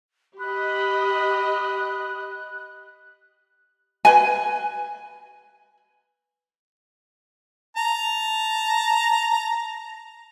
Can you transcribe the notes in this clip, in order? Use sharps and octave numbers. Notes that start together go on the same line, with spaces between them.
G4 D#5 B5 F#6
B4 G#5
A5 A#5